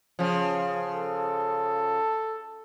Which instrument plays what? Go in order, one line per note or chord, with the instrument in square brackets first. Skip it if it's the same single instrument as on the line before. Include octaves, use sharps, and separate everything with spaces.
[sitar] C#3 F3
[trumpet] A4